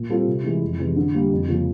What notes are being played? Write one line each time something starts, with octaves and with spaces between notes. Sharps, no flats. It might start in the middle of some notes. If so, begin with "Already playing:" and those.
Already playing: A#2
G3 C4 F4 A4
C3
E3 G#3 B3 E4
F2
C3 E3 G#3 C#4
D3
G3 A#3 C#4
F2
C#3 F3 A#3